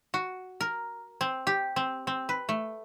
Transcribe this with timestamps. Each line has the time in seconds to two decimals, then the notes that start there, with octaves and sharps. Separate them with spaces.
0.14 F#4
0.61 A#4
1.21 C4
1.47 G4
1.76 C4
2.07 C4
2.29 B4
2.49 A3